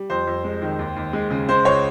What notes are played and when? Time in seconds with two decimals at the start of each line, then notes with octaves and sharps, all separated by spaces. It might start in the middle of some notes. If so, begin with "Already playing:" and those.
Already playing: G3
0.10 F2 C5
0.27 F2
0.44 G#3
0.62 D#3
0.79 D#2
0.96 D#2
1.13 G#3
1.30 C#3
1.49 G#3 C5
1.65 C#2 C#5